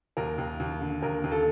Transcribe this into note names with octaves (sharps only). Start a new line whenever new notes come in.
D#2 A#4
D#2
D#2
D3
D#2 A#4
D#2
A4